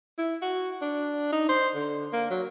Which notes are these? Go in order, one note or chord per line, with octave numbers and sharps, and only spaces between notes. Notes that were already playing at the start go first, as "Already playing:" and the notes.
E4
F#4
D4
D#4
C5
D3
A#3
F#3